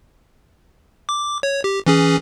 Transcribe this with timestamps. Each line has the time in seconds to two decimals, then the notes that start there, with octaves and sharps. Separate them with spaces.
1.09 D6
1.43 C#5
1.64 G4
1.86 E3 C#4 G#4